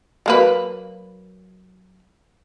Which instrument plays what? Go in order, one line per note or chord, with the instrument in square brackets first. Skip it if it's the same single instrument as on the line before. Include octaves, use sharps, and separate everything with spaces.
[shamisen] F#3 A#3 B4